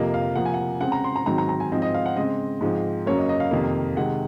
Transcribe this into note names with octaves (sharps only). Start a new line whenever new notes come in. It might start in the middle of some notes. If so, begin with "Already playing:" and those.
Already playing: F2 C3 F3 A#3 D#5
F5
C3 F3 A#3 F#5
G#5
F#5
C#3 G#3 C4 F#5
A#5
C6
A#5
G#2 D#3 F#3 C4 A#5
A#5
A#5
G#5
G#2 F3 C4 D#5
D#5
F5
F#5
C#3 G#3 C4 D#5
G#2 F3 G#3 C4
F#2 C#3 F#3 A#3 C#5
D#5
D#5
F5
F2 C3 D#3 A#3
C3 D#3 G#3 F#5